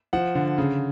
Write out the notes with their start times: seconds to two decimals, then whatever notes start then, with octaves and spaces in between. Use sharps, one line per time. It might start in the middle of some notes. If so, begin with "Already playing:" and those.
0.13 F3 F#5
0.35 D3
0.58 C#3